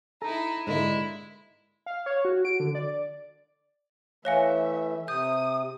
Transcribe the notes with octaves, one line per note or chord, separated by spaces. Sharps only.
D#4 E4 A4 A#5
G#2 D3 G#3 A#3 E4
F5
C#5
F#4
D7
D3
D5
E3 A3 C#5 E5 F5 G#5
C3 D#6 G6